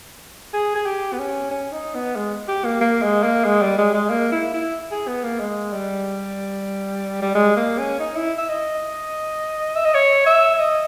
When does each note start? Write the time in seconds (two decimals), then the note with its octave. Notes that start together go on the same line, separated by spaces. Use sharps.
0.54 G#4
0.75 G#4
0.86 G4
1.13 B3
1.19 C#4
1.51 C#4
1.72 D#4
1.95 B3
2.16 G#3
2.48 G4
2.64 A#3
2.81 A#3
3.02 G#3
3.23 A#3
3.45 G#3
3.62 G3
3.78 G#3
3.94 G#3
4.10 A#3
4.32 E4
4.54 E4
4.92 G#4
5.08 B3
5.24 A#3
5.40 G#3
5.73 G3
7.22 G3
7.35 G#3
7.57 A#3
7.79 C#4
8.00 D#4
8.16 E4
8.38 E5
8.49 D#5
9.76 E5
9.85 D#5
9.95 C#5
10.27 E5
10.59 D#5